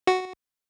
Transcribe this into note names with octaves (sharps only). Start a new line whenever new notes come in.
F#4